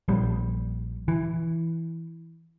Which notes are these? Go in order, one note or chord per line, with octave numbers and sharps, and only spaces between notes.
A#1 G3
E3